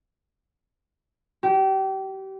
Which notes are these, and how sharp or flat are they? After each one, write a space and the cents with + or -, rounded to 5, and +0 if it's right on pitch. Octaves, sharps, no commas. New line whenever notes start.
G4 -30